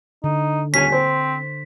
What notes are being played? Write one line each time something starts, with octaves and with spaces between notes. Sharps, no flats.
D3 D#4
D#1 C#4 G#5 B6
C4 C5